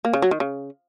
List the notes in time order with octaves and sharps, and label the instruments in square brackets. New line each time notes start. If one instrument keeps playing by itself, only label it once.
[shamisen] A#3
C#3
F#3
D#3
C#3